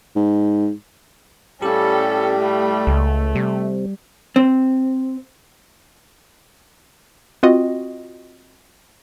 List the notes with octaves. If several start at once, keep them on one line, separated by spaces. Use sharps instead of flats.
G#2
A2 G3 C#4 G4 A4 F5
A3
C#2
C3 G3
C4
C4 F4 F#4 D#5